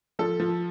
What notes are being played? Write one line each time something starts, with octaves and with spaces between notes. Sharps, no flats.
F3 A4
F3